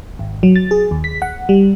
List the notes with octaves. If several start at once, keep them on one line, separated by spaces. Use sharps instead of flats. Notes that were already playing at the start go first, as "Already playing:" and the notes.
G#1
F#3
A6
G#4
D#2
B6
F#5
G3